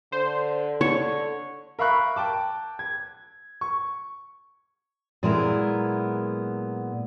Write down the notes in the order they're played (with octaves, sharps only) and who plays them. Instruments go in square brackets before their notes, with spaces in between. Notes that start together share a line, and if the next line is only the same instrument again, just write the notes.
[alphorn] D3 [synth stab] C5
[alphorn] D3 [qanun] C#5
[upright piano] A#4 E5 F5 B5 C#6 F#6
G5 A5 D6
G#6
C#6
[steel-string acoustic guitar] A#2 F#3 G#3 B3 E4 A#4